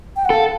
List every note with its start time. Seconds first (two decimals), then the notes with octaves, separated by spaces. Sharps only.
0.16 G5
0.25 F#5
0.30 A4 F5